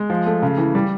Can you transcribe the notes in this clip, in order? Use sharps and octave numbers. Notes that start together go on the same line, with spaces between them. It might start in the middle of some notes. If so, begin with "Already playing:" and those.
Already playing: G#3
F3
A3
C#3
E3
G3